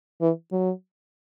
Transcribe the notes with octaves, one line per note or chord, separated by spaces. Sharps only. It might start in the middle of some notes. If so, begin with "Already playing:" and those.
E3
F#3